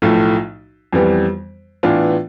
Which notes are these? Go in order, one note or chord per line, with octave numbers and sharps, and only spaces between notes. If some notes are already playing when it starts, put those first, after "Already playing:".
B1 A2 F3 A3
F2 E3 G3 B3
A2 E3 B3 D4 F4